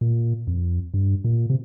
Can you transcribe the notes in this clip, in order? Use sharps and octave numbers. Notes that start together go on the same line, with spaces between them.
A#2
F2
G2
A#2
C3